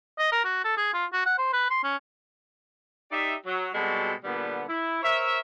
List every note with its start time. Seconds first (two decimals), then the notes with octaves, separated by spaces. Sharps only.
0.19 D#5
0.32 A#4
0.44 F#4
0.64 A4
0.77 G#4
0.94 F4
1.13 F#4
1.25 F#5
1.38 C5
1.53 B4
1.70 C6
1.84 C#4
3.11 D#4 G4 D5 E5
3.46 F#3
3.74 B2 G3 G#3 C4 F#4 A4
4.24 A#2 D3 G3 B3
4.68 E4
5.03 A#4 C5 C#5 E5